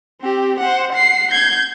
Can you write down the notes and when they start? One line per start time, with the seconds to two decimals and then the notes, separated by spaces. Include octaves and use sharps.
0.21 C4 G4
0.60 C5 F#5
0.93 F#5 C7
1.31 G6 G#6